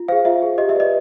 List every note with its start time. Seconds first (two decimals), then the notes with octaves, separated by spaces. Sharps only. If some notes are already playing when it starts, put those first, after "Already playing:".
Already playing: F4
0.08 G#4 C5 F5
0.25 F4 E5
0.42 G#4 C5
0.58 G4 D#5
0.69 E5
0.75 B4 D5 D#5